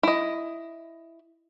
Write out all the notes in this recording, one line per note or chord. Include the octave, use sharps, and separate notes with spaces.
E4 D#5